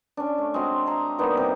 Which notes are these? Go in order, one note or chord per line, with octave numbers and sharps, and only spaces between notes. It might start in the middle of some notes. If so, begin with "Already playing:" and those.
C#4 D4
A3
G#3 C4 F#4
E5 A#5 C6
G3 A#3 B3 D#4
C3